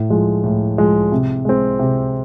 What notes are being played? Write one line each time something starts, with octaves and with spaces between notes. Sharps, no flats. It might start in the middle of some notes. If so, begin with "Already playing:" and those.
Already playing: A2
F3 G#3
A2
F3 G#3
C3
G#3 C4
C3